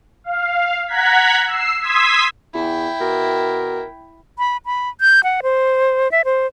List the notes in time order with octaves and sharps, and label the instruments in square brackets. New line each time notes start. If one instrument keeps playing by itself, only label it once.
[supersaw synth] F5
F#5 A#5 F#6 G#6 B6
E6 C7
C6 D#6 E6 G#6 B6
[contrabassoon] E2 [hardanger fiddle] E4 G5
[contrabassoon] B2 [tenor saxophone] A#4
[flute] B5
B5
G6
F#5
C5
E5
C5